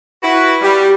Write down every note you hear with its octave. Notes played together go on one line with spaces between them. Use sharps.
E4 F#4 B4
G3